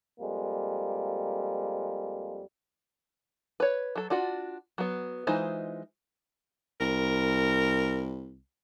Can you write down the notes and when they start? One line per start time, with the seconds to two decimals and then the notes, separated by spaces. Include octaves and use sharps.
0.20 F2 G3 G#3 A#3
3.60 B4 C#5
3.96 F#3 A4
4.10 D4 F4 F#4 F#5
4.78 F#3 B3
5.27 E3 G#3 D#4 F4 C5
6.81 C2 A#4